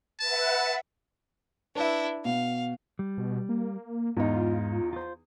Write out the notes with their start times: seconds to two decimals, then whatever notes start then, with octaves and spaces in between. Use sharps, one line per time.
0.20 B4 E5 F#5 A5
1.76 D4 E4 B4 E5
2.25 B2 F5
2.99 G3
3.18 B2
3.49 A#3
4.17 E2 G#2 D#4 F4
4.93 F4 C5